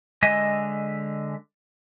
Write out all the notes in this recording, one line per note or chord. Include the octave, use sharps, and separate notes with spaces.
D3 G#3 D#5 E5 G#5